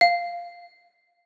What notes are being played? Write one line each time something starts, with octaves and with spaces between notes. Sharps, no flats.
F5